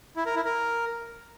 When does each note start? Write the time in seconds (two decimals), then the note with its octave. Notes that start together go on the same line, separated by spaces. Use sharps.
0.16 E4
0.26 A#4
0.35 E4
0.45 A#4